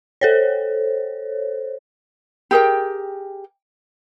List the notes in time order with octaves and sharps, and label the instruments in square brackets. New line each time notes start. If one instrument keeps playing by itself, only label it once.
[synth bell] A4 C5 C#5
[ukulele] G4 G#4 A#4 G5